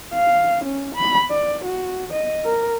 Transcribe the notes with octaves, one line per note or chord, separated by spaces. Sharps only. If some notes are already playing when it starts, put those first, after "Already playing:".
F5
C#4
B5
D5
F#4
D#5
A#4